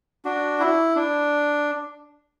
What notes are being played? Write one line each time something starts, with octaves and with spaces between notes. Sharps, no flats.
D4 F#4
E4
D4